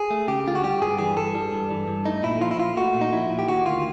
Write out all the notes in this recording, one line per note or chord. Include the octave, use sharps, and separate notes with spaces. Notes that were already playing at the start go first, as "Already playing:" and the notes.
Already playing: G#4
A3
C#3 G4
D2 F4
F#4
G3 G4
G2 G#4
E3 G#4
G2 A4
G3
G2
E3
G2
A3 D#4
A#2 E4
F3 F4
E4
A#2 F4
A3 F#4
A#2
D#4
F3 E4
A#2
G4
D#3 F#4
D2 F4